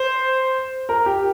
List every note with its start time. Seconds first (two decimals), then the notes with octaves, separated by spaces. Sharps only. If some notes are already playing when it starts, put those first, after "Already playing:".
Already playing: C5
0.89 A#4
1.06 G4